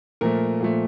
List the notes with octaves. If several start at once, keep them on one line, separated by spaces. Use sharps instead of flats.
A#2 F3 A3 A#4
A#2 F3 A3